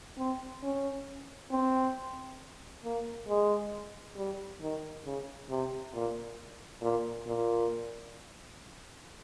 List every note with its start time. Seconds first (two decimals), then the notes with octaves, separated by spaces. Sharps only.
0.18 C4
0.63 C#4
1.51 C4
2.84 A#3
3.28 G#3
4.16 G3
4.61 D#3
5.05 C#3
5.50 C3
5.93 A#2
6.82 A#2
7.26 A#2